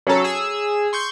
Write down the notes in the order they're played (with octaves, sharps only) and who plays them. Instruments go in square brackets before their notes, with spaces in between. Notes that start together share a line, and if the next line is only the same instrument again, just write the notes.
[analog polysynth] F#3 C#4 A4 [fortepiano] C#5 A#5
[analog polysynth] G#4 E6
C6 C#6 G6